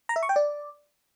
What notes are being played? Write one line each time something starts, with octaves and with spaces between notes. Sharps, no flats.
A#5
E5
C#6
G5
D5